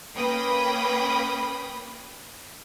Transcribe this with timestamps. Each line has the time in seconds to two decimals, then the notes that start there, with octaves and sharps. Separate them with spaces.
0.16 A#3 C#4 B4 G5 B5 D#6